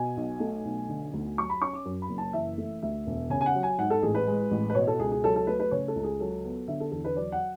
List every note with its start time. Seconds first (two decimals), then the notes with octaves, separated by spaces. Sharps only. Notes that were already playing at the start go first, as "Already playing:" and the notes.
Already playing: B2 G#5
0.17 B1
0.40 A3
0.65 B1
0.89 D3
1.13 D2
1.37 F#3 C#6
1.50 B5
1.61 C#4 C#6
1.73 D6
1.85 F#2
2.02 B5
2.09 F#1
2.18 A5
2.33 E3 E5
2.58 A3
2.82 D2 E5
3.07 E1
3.30 C#3 G#5
3.41 G#5
3.46 F#5
3.55 F#3
3.63 G#5
3.78 G#2 F#5
3.90 A4
4.02 A1 G#4
4.15 B4
4.27 G#3
4.51 A1
4.70 B4
4.75 B2 C#5
4.87 A4
4.99 C#2 G#4
5.12 G#4
5.23 F#3 A4
5.36 A4
5.47 A3 B4
5.60 B4
5.71 C#3 C#5
5.88 A4
5.96 C#2
6.04 G#4
6.20 F#3 A4
6.44 B3
6.68 D3 E5
6.80 A4
6.92 E2 A4
7.05 B4
7.16 F#3 D5
7.32 F#5